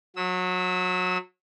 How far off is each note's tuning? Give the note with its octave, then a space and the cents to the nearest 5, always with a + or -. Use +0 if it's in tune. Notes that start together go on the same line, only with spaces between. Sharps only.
F#3 -25 E6 -25